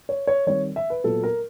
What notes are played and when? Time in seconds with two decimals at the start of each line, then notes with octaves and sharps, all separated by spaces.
0.09 C#5
0.27 C#5
0.47 D#3 G3 C4 C#5
0.76 E5
0.90 B4
1.04 A#2 F#3 B3 A4
1.23 A#4